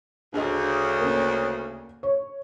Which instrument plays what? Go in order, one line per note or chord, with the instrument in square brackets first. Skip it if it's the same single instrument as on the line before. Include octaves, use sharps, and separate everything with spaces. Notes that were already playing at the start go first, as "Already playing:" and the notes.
[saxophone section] D2 C#3 [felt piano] D4 G#4 D#5
[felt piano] A#3 C#4
C#5